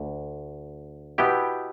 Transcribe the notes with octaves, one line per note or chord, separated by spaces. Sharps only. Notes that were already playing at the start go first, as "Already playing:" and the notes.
Already playing: D2
B2 B3 E4 G4 G5